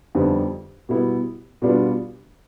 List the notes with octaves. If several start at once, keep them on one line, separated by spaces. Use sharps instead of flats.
F2 D3 G3 B3 D#4
B2 G3 B3 E4
B2 G3 B3 D4 F4